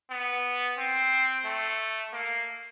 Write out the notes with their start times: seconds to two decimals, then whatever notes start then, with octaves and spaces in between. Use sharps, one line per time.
0.10 B3
0.78 C4
1.45 A3
2.13 A#3